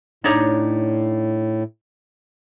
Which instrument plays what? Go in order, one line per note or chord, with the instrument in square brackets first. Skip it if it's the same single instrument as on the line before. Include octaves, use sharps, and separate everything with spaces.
[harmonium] A2 [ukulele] D4 D#4 C#5